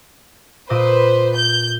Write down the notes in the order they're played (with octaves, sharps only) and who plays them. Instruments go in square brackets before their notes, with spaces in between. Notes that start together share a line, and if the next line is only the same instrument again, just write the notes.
[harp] A#2 D#5 D6 [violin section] B4 C5
[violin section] G6